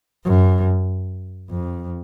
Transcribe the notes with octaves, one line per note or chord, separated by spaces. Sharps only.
F#2
F2